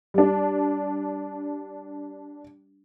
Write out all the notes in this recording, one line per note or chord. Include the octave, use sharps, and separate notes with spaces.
G3 D4